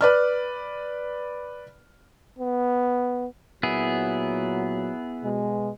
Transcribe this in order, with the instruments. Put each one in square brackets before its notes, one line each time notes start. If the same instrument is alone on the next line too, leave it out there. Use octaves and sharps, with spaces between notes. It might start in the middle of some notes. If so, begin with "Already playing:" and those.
[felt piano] B4 D5 F6
[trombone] B3
[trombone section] A#2 F#3 [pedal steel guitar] B3 E4 G#4
[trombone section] B2 G#3